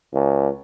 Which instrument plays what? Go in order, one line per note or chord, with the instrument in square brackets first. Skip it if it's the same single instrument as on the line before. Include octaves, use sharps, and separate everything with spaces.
[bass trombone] C#2